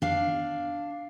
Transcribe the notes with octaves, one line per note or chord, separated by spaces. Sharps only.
D4 F5